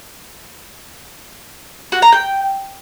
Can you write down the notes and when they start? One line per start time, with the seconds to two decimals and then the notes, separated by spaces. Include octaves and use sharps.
1.92 F#4
2.02 A#5
2.12 G5